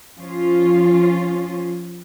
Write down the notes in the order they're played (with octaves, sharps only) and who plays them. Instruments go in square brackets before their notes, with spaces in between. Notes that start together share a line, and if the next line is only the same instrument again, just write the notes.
[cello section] F3 C#4 F4